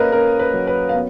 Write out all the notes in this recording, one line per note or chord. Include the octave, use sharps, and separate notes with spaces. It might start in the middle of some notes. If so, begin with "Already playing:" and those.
Already playing: A#3 C#4 A#4 B4 D#5 F5
C#4 A#4
B4
F#3
B4
F5
B3